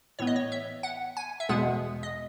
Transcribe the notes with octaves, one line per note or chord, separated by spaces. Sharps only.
A2 E3 B3 C#5
D#5
C#5
E5
F#5
G#5
E5
E2 B2 G#3 B3 F#5
D#5